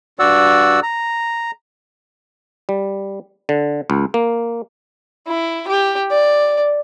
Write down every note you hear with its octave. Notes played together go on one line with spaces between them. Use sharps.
G2 F#4 D5 F#5 E6
A#5
G3
D3
C#2
A#3
E4
G4
D5